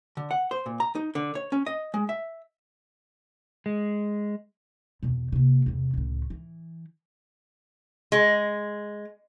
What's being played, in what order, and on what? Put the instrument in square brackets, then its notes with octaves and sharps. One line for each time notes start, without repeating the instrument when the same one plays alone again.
[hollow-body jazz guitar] D3
F#5
C5
A#2
A#5
D#4
D3
C#5
C#4
D#5
G#3
E5
[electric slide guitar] G#3
[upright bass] E2 B2
C3 A#3
E2 C3
C#2 A2
E3
[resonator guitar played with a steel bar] G#3